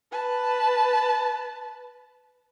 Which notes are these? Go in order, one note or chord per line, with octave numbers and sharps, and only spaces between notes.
B4 A5